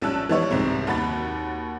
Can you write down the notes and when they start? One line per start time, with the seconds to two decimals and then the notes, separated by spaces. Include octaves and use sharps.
0.02 A#1 G3 C#4 A5 E6 F#6
0.29 E3 F3 G3 B3 C#5
0.50 C2 G#2 C3 C4
0.87 D#2 F#4 B5 A6